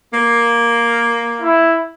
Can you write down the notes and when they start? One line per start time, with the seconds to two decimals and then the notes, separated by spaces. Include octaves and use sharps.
0.14 A#3
1.42 E4